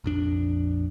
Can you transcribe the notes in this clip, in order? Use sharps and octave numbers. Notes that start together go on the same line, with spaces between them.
A#1 F2 D4